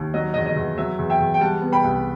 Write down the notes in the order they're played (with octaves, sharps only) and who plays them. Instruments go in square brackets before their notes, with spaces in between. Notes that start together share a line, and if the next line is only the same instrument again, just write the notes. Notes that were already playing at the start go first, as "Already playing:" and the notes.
Already playing: [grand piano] D#2
F#3 D#5
E2 D#5
D#5
E2
F#3 E5
E2
E5 G5
E2
G5
G3 F#5 A5
B3
G5 B5
C2